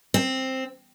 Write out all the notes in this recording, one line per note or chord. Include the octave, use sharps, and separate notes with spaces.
C4